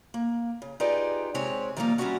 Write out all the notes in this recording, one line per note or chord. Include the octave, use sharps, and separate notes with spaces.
A#3
C#3
D#4 F4 G4 G#4 B4 D5
C3 G#3 C4 G4 C#5 G#5
D#3 F3 G3 A3 A#3 F4
G3 C4 C#4 E4 F#4 F#5